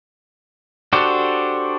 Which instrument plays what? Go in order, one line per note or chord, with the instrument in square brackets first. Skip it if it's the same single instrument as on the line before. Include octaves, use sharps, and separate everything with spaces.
[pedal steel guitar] D4 F#4 G4 A4 C5